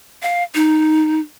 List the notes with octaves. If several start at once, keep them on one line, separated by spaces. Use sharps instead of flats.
F5
D#4